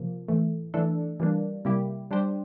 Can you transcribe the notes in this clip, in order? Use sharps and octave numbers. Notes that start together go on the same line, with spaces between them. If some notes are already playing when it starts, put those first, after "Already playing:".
Already playing: C3 F3 A#3
A2 E3 A3
E3 A3 D4 A4
E3 G3 A#3 D4
C3 G3 A#3 E4 G4
G3 D4 G4 C5